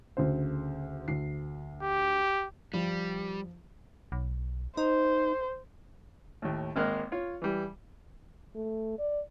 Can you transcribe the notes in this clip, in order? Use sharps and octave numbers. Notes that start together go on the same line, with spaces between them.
D2 C#3 C5
D2 C7
G4
F3 G3
B1
D#4 C5
D#2 A2
G#1 G#3 A#3 F6 F#6
F4 C#5
E3 G3
A3
D5